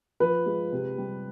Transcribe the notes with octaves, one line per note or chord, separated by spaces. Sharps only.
F3 B4
G#3
C3
G3